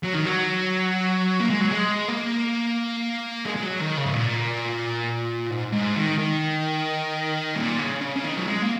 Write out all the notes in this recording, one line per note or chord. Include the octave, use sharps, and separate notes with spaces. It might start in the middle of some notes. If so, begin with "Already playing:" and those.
F#3
D#3
F#3
A#3
G#3
F#3
G#3
A#3
G#3
G#3
F#3
D#3
C#3
G#2
A#2
G#2
G#2
D#3
D#3
A#2
C#3
C#3
C#3
D#3
F#3
G#3
A#3